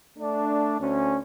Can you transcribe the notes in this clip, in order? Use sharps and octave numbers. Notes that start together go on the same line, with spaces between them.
A3 D4
D2 C#4